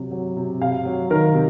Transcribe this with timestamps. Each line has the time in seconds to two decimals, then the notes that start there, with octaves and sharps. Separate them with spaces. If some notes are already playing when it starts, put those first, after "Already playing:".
Already playing: C3 F#3
0.11 F#3
0.37 C3
0.61 C3 F5
0.85 F#3
1.10 D#3 A#4
1.34 C3